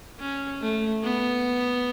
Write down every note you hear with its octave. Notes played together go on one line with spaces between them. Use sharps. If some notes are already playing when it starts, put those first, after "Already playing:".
C#4
A3
B3